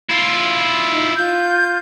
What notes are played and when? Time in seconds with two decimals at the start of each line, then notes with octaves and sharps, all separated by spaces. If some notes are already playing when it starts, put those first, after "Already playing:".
0.10 E4 F4
0.90 D#4
1.16 F4 G6